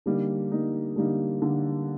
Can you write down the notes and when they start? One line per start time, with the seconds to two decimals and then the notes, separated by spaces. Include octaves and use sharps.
0.06 D3 G3 A#3 D#4
0.51 D3 G3 A#3 D#4
0.96 D3 G3 A#3 D#4
1.42 D3 G3 A#3 D#4